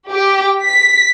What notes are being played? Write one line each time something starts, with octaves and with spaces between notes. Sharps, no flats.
G4
B6